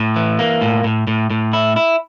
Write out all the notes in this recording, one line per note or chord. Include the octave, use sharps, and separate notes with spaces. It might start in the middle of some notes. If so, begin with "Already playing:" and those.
Already playing: A2
E3
A#3
A2
A2
A2
A2
E4
E4